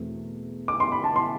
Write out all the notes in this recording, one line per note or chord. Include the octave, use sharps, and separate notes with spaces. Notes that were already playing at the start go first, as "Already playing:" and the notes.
Already playing: E2 B2 A3 C4
D6
C6
B5
A5
C6